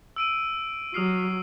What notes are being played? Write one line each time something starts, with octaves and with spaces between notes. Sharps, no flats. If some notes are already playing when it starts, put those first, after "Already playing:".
E6 D7 D#7
F#3 D#6 F6 C7